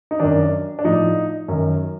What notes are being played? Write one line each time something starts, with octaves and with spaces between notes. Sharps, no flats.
D#4
F#2 D#3 D4
D4
A2 F3 D#4
F#2 D#3